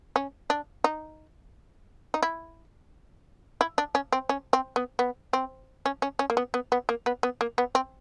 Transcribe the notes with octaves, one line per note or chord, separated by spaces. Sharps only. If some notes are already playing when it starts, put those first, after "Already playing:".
C#4
D4
D#4
D#4
E4
E4
D4
C#4
C4
C#4
C4
B3
B3
C4
C#4
C#4
C#4
A#3
B3
B3
B3
A#3
B3
B3
A#3
B3
C4